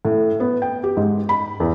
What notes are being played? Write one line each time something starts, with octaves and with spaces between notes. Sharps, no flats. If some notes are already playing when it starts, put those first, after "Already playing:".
A2
B3
G5
G4
G#2
B5
E2